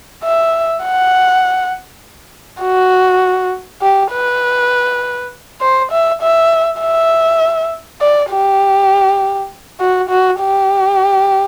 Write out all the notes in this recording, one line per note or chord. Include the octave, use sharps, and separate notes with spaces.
E5
F#5
F#4
G4
B4
C5
E5
E5
E5
D5
G4
F#4
F#4
G4